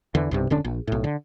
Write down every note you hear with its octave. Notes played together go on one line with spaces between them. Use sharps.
E2 D3 E3
B1 G2 C3
E1 D3 C#4 D4
A#1
B1 A2
D3